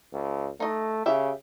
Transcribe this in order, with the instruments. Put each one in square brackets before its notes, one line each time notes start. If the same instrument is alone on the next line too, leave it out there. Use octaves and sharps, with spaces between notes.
[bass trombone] C#2
[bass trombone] A3 [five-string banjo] D#4 D#5
[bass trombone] C#3 [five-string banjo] G4 E5